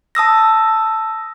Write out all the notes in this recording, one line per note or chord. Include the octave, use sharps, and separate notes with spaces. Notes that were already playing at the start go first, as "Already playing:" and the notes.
A5 D#6 E6 A#6